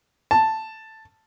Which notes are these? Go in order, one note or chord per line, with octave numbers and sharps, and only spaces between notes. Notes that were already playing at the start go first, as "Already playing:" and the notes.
A5